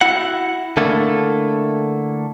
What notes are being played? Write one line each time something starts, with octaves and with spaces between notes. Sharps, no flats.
E4 F#4 F#5
D3 A3 A#3 E4 A4